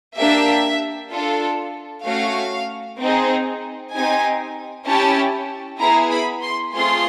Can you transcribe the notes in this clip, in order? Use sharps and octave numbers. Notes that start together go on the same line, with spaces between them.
A#3 D4 G4 E5
D4 F4 A4
A3 C#4 F#4 F5
C4 D#4 G#4
C4 D#4 G4 G#5
C#4 E4 G4 A5
B3 E4 G#4 A#5
B5
C6
A3 C4 F4 G#4 C6